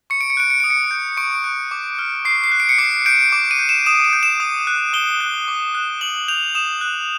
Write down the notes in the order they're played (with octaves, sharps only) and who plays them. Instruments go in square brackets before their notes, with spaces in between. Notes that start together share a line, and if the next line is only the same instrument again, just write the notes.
[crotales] C#6 C#7
D7
C#7
F#6 D7
C#7
D#6 D7
C#7
G6
C#6 D7
F#6
D6
F6
C#6 C7
C7
F#6
D7
C#7
D6 C7
G6 D7
D6
D#7
G6
E7
D#6 E7
D#7
G6
E7
D#6
F#6
D#6 G7
F#6
D6
F#6
D#6 F#7
G6 F7
D#6 E7
F#6